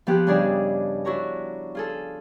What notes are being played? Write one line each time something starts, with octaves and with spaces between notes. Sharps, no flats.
F3 B3 G4 G#4 F#6
G2 C#3 D4 G#4 D5 D#5
D4 E4 F#4 C#5 A#5
F4 G#4 A4